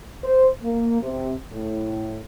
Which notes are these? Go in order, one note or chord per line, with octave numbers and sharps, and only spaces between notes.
C5
A#3
C3
A2